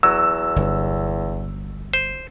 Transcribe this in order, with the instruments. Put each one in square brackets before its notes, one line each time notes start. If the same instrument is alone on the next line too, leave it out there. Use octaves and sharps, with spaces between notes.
[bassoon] E2 [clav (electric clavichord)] F#3 [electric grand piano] E6
[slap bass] G1
[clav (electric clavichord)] C5